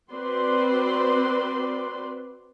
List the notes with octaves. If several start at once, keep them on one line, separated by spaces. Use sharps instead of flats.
C4 F#4 B4 C5 D5 C6